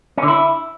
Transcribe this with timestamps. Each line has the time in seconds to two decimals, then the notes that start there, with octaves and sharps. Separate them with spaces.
0.18 C#4
0.23 D3
0.28 E4